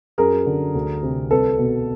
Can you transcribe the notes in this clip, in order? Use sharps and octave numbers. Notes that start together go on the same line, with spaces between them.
F#2 G#4 A#4
D3
D2
C3
C2 A4 B4
B2